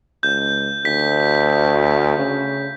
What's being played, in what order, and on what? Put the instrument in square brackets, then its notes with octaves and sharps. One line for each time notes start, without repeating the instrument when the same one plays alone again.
[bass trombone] C#2 [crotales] G6
[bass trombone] D2 [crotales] B6
[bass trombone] C#3